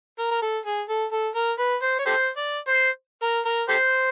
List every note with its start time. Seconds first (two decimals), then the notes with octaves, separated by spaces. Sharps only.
0.19 A#4
0.31 A#4
0.42 A4
0.66 G#4
0.89 A4
1.12 A4
1.35 A#4
1.59 B4
1.82 C5
1.99 C#5
2.06 G4 A4 C5
2.37 D5
2.68 C5
3.23 A#4
3.46 A#4
3.69 G4 A4 C5